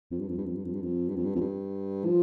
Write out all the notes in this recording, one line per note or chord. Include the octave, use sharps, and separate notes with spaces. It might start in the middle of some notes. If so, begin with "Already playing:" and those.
F2
G2
F2
G2
F2
G2
F2
G2
F2
G2
F2
G2
F2
G2
F3